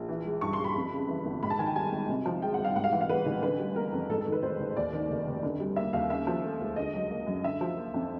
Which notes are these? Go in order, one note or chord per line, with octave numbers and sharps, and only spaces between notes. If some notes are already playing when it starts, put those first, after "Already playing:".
Already playing: A#1
E3
G#3
G2 C#6
C6
G2
B5
F2
C#3
E3
G1
G#2 B5
A5
D#3 G#5
G5
G3 G#5
G#1
C3
F3
G#3 G5
F#5
C2
F5
G#2 F#5
F5
E3 F#5
F5
A1 B4
A1
D3 B4
G3
B3 A#4
F2
G#2 A4
A4
D#3
B4
A1 C5
A1
D#2 D5
D#3
F1
F1
D3
G3
A#3 E5
D#2 F5
C#3 E5
F3
A3
C#2
D3 D#5
F#3
A#3
F#2
D3 E5
F3
A#3
F2